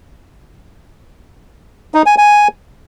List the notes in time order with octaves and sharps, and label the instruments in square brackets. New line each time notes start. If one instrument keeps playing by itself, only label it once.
[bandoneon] D#4
G#5
G#5